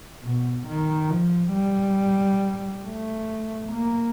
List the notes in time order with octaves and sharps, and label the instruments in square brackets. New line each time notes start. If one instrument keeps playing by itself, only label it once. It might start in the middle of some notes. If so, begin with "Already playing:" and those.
[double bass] B2
D#3
F3
G3
A3
A#3